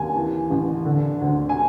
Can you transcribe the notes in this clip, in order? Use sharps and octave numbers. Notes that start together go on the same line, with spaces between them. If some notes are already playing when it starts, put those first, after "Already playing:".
Already playing: D#2 G#5
E3
A1
D3
D2
G#5